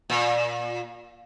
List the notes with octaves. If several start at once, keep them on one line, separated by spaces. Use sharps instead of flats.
A#2